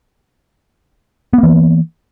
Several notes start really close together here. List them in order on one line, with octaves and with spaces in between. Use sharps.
B3 A#3 E3